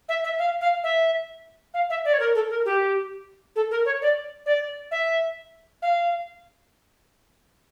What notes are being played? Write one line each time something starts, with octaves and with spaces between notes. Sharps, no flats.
E5
E5
F5
F5
E5
F5
E5
D5
C#5
A#4
A4
A#4
G4
A4
A#4
C#5
D5
D5
E5
F5